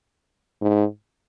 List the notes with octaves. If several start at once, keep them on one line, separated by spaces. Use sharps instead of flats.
G#2